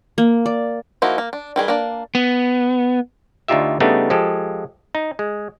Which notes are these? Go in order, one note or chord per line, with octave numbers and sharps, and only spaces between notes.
A#3
D5
F3 A#3 D#4 E4 F#4
A#3
D4
D#3 G3 G#4 B4
A#3 D4
B3
D2 D4 D#4 F4 G4 E5
C#3 G3 A3 B3 D4 D#4
F3 G#3 G4 A4
D#4
G#3